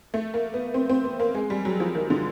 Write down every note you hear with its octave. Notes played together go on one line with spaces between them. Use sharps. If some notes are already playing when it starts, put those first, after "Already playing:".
A3
A#3
B3
C4
C4
B3
A#3
G#3
G3
F#3
F3
D#3
D3